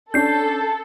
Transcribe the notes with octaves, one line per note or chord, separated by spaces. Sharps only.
C#4 D4 A4 G6 C7